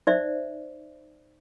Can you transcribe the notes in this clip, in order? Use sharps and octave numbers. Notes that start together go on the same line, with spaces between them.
D#4 C5 D5 E5